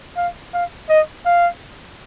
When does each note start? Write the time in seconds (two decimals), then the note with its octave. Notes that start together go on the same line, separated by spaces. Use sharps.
0.17 F5
0.53 F5
0.89 D#5
1.25 F5